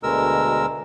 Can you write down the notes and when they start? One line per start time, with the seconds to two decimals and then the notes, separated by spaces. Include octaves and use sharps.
0.03 D2 B2 G#3 A#4 E6